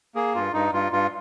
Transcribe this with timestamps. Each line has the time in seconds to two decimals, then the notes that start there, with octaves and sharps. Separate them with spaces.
0.15 A#3 G#4
0.35 G2 F4
0.53 G2 D#4
0.72 G2 F4
0.92 G2 F4